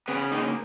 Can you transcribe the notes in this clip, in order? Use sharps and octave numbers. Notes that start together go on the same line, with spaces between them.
C#3 B3
A#3 D#4